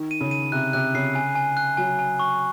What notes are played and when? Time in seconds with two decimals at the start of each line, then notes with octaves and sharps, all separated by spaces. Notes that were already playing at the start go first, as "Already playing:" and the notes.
Already playing: D#3
0.11 D#7
0.21 C#3
0.31 D#7
0.52 C3 F#6
0.73 C3 F#6
0.94 C#3 C7
1.15 G#5
1.35 G#5
1.57 F#6
1.77 F#3 G#5
1.99 G#5
2.19 C#6